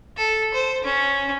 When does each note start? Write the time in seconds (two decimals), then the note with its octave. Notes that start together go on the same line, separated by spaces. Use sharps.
0.17 A4
0.54 C5
0.84 C#4